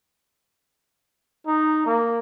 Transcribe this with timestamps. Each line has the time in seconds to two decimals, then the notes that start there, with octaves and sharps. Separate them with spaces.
1.47 D#4
1.86 A#3